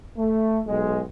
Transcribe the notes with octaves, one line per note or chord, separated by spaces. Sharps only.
A3
B1 G#3